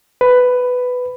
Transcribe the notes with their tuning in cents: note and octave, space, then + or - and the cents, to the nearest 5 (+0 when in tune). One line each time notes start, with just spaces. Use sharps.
B4 +10